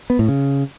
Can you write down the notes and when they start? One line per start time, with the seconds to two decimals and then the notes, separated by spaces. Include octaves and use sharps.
0.10 B3
0.19 A2
0.28 C#3